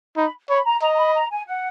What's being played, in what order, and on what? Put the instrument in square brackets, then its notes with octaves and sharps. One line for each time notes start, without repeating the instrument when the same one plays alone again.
[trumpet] D#4 [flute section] B5
[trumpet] C#5 [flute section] B5
[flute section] A#5
[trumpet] D#5 [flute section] A#5
[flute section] A#5
B5
A#5
G#5
F#5